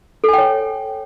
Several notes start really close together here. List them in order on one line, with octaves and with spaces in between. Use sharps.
A4 G#5 G5 C#5